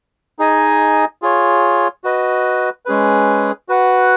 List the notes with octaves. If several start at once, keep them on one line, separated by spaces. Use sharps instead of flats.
D#4 G#4 D#5 G#5
F4 G#4 C#5
F#4 B4 D#5
G#3 C#4 G#4 B4
F#4 B4 F#5